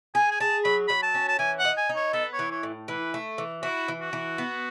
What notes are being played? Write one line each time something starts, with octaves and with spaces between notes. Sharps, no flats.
G#4 G#5
G#5
G#4 A5
F#3 B5
F#3 B5
A5
C#4
A5
E3 G#5
F#5
D#4
G#5
D#4
C#5
B3 A4
C#5
E3
C#5
A2
E3 B4
A3
E3
E4 F#4
E3
F#4
E3
B3